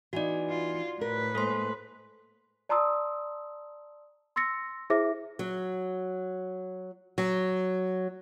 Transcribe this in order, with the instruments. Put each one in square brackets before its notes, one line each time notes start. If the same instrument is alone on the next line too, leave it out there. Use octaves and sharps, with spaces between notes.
[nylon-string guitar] E3 B3 D#4 [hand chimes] F#4 D5
[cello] F4
[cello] A2 B4 [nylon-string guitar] A#4
[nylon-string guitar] G#3 A#3 [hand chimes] A4 C5 C6
[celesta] D5 A5 A#5 C6 D#6 E6
C6 E6 A6 A#6 C#7
E4 G#4 C5 E5 D6 A#6
[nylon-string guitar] F#3
F#3